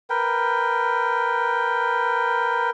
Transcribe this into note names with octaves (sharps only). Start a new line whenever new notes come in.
A#4 B4 G5